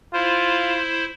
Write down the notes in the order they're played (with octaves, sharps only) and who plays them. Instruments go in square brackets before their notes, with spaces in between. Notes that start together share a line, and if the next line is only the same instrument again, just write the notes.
[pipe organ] E4 C5 [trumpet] F4